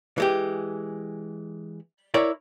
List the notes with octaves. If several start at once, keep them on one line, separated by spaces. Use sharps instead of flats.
E3 G#3 G4
E4 A#4 C#5 D5